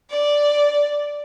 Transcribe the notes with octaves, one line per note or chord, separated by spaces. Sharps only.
D5